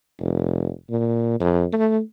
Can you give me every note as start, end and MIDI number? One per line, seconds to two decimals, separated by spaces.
0.20 0.70 29
0.90 1.36 46
1.40 1.64 41
1.73 1.99 57